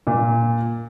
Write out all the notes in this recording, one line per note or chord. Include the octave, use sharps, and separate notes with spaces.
A#2